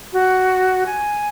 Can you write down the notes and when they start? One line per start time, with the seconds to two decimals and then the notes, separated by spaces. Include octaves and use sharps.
0.13 F#4
0.86 G#5